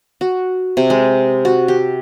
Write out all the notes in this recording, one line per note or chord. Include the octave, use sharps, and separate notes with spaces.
F#4
C3
G#3
F#4
G4